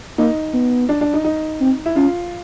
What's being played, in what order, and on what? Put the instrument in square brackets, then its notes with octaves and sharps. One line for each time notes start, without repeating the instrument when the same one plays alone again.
[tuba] A#3 [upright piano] D#4
[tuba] B3
[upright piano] D4
D4
D#4
D#4
[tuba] C4
[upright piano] E4
[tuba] C#4 [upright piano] F4